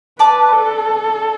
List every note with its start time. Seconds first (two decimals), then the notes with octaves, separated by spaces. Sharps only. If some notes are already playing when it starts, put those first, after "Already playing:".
0.19 B4 D5 A5 D6
0.53 A4